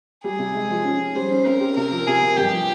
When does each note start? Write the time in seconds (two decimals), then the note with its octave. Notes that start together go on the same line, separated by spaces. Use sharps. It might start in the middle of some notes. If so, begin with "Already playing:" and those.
0.24 G3 G#4
0.39 C3
0.55 G#3
0.70 F3
0.84 C#4
1.00 C#4
1.15 G3 C5
1.31 C#4
1.46 C4 A#4
1.60 G4
1.76 C3 A#4
1.91 F3
2.07 C3 G#4
2.22 C3
2.37 G2 G4
2.52 F3